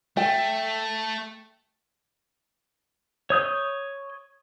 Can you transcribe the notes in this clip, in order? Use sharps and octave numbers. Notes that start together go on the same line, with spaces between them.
A3 G5
C#5 D#6 G6